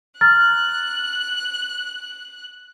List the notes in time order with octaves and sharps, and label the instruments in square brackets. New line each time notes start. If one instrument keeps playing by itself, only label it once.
[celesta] A#5 F6 A6 [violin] F#6